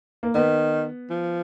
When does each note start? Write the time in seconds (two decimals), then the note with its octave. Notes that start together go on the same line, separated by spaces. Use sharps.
0.23 A#3
0.35 D#3 B3
1.10 F3